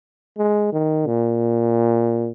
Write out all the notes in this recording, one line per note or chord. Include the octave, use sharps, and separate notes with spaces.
G#3
D#3
A#2